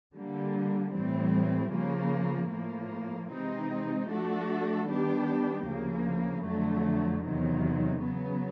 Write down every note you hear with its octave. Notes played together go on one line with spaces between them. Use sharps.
D3 G3 A#3
A2 E3 G3 C4
C#3 F3 A#3
A2 F3 A#3
C3 E3 G#3 C4 D#4
F3 A3 D4 F#4 A4
D#3 G3 B3 D4 G4
D2 C#3 F3 A#3
F2 D3 F#3 A3
E2 C3 D#3 F#3
C#3 F#3 B3